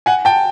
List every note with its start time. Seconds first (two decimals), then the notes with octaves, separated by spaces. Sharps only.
0.06 F#5 G#5
0.25 G5 A5